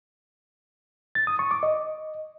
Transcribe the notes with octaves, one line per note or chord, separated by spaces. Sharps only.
A6
D#6
C#6
D6
D#5